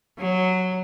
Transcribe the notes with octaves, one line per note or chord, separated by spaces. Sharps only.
F#3